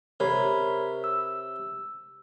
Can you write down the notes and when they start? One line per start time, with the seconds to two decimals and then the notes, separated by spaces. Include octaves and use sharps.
0.20 C3 A#4 C#5 B5
1.04 E6